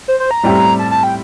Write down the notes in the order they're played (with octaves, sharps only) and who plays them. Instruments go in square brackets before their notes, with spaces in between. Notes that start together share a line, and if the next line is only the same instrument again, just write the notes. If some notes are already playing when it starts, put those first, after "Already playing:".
[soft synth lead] C5
C5
A#5
[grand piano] A2 G3 C4 E4 G4
[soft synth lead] A5
A5
G5